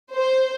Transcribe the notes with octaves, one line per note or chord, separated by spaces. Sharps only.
C5